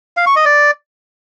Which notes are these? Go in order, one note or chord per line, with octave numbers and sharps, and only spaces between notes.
F5
C#6
D#5
D5